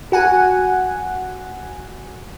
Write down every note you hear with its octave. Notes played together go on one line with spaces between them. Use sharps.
F#4 F#5 G#5